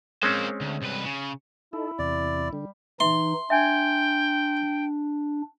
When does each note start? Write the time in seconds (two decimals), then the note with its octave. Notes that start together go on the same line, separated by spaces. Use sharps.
0.23 G#3 A#3 C4 C#4 C5
0.61 D2
0.83 C2 B4
1.06 C#3
1.73 D#4 E4 A4
1.99 E2 C3 D5
2.53 D3 G3
3.00 E3 D#4 E5 C6
3.50 D4 E5 G5 G#5 G#6